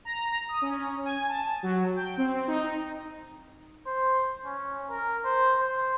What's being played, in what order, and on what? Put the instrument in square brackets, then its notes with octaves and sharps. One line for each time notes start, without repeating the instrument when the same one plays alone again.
[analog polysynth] A#5
D#6
C#4
G#5
A5
F#3
G5
C4
D#4
[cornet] C5
C#4
A#4
C5
C5